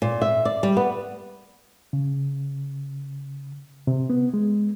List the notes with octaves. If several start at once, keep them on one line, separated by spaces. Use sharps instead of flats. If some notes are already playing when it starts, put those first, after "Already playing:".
A#2
E5
D5
G3
B3
C#3
C3
B3
G#3